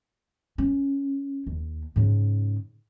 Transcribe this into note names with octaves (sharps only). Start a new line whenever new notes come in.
C#4
D#2
G#2 C#3